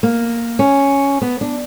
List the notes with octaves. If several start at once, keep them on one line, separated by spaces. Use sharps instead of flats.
A#3
C#4
B3
D4